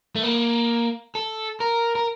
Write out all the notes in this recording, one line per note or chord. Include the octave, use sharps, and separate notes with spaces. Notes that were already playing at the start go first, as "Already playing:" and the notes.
A3
A#3
A4
A#4
A#4